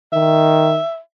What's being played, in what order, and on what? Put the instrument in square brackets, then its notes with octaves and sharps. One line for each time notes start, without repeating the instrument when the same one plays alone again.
[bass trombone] D#3 [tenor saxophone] E5